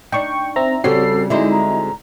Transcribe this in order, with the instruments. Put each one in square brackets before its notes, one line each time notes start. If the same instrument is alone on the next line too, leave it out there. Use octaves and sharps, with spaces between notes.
[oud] D4 D#4 [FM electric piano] G5 C#6
[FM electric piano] C4 A#5 [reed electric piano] E5
[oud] C#3 G3 C#4 [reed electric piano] C4 F#4 [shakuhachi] A4 [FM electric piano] C7
[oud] D3 G#3 C5 [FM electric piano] D#4 E4 [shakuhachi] D#5
[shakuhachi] A#5